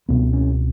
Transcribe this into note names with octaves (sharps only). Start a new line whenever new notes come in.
C#2 B2 B3
C#4